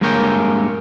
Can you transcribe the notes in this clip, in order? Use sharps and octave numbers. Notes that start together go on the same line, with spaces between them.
G2 G#3 A#3 A#4 C#5 G5